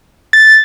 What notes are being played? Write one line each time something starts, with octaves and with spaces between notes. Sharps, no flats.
A6